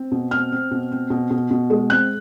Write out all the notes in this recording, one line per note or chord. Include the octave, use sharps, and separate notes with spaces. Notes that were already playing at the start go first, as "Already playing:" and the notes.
Already playing: C4
B2
C4 F6
C4
B2
C4
B2
B2
B2
G#3
C4 F#6